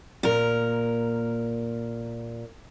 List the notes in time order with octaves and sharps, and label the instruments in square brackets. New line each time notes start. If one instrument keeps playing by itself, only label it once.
[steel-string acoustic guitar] A#2 A#4